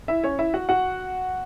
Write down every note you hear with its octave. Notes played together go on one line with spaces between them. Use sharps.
E4 E5
C#4 C#5
E4 E5
F#4 F#5
F#4 F#5